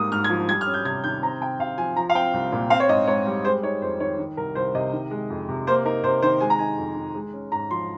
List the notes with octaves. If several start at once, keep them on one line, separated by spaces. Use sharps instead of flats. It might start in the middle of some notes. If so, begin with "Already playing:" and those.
Already playing: G#2 G3 A#3 D#6
G#2 F6
G#6
F3
G3 G#6
F6
C#4
G6
C3 G#6
D#3 G6
C4 A#5
C3 G5
C3 F5
F3 G#5
F3 A#5
F5
C4 G5
C2
A#2
C4 F5
C#5
G#2 D#5
G#2 C#5
G3
G#3 C5
D#4 C#5
F2 C5
D#3 C#5
D#3
C2 A#4
C2 C5
C3 D#5
D#3
G#3
F2
C3
A#3 C5
D#4 A#4
C3 C5
D#3 C5
G#3 G#5
A#5
D#4 G#5
F2
D#3
G#3
C#4
G#2 A#5
F3 C6